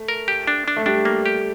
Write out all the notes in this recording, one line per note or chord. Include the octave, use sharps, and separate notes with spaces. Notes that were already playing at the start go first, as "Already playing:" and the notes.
Already playing: A3
A#4
G4
D4
D4
A3
G3 D4
A#3
G4